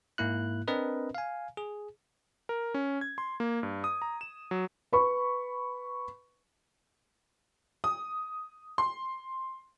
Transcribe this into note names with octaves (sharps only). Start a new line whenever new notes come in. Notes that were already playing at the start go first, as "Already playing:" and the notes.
G#2 A#3 E4 F#6
C4 D4 A#4 B4 D#5
F5 G#5
G#4
A#4
C#4
G#6
C6
A#3
G2
D#6
A#5
E7
F#3
B4 B5 C#6
D#6
C6